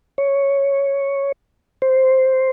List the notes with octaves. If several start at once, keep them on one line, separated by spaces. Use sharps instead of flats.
C#5
C5